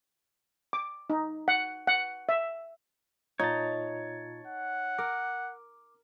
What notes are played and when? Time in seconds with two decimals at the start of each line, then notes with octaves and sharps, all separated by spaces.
0.73 D6
1.10 D#4
1.48 F#5
1.87 F#5
2.29 E5
3.40 A#2 D#4 F4 C#5 A5 A#5
4.47 F#5
4.98 A#4 D6